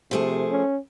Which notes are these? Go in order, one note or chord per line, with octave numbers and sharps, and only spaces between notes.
C3 F3 A3 G#4
C#4